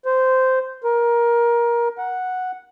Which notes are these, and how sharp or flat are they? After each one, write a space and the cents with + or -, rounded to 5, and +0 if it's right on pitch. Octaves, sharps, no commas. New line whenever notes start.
C5 -10
A#4 +20
F#5 -5